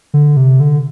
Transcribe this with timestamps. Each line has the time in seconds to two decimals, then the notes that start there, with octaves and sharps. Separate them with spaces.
0.14 D3
0.37 C3
0.60 D3